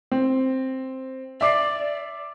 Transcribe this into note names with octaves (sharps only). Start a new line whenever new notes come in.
C4
D5 E5 D6 C7